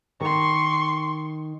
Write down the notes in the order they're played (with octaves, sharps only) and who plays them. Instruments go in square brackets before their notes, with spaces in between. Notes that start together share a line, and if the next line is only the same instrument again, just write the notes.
[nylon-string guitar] D#3 A#4 [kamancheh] C6 C#6